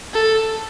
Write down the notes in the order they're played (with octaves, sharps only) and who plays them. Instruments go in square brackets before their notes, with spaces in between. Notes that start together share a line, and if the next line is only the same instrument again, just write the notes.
[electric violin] A4